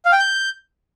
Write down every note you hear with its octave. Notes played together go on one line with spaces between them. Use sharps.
F5
G5
G6